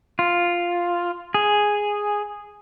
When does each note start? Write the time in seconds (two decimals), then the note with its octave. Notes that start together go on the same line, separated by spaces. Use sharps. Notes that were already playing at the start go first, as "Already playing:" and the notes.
0.19 F4
1.34 G#4